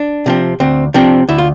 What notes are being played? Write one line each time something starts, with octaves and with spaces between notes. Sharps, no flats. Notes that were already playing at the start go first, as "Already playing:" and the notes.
Already playing: D4
C3 F3 C4
D2 C4
C3 F3 C4 D4
D2 E4
F4